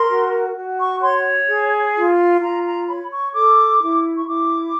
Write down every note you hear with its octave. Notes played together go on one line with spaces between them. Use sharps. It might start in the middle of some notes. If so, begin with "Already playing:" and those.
Already playing: A#4 C6
F#4
F#4
C#6
C#5 C6
G#4
F4
F4 A#5
A#5
C#5 B5
C#6
A4 D6
E4
C#6
E4 D6